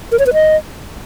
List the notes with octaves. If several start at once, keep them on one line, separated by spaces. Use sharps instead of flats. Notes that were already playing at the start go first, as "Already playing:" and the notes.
A#4
C#5
B4
D#5